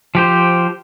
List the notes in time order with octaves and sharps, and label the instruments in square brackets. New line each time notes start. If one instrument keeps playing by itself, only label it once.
[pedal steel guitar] F3 G4 C5